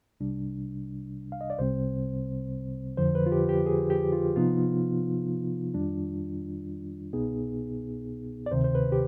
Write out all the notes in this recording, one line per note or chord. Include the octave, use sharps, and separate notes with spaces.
C2 C3 G3 D4
F5
D#5
D5
C2 C3 G3 C4 C5
F2 D3 F3 C5
B4
F4
G4
G4
G#4
G4
F4
C3 F3 B3 D#4 F4
F2 D#3 G3 D4
C2 B2 B3 D#4 G#4
D5
D2 C3 D#3 C5
C5
B4
G4